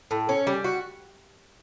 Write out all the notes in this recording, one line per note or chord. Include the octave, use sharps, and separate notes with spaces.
A2
C#4
G3
F#4